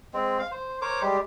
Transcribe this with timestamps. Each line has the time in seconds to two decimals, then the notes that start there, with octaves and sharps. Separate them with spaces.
0.13 G#3 C4
0.39 F5
0.51 C5
0.81 A#4 C5 C#5 D6
1.02 G3 G#3 G4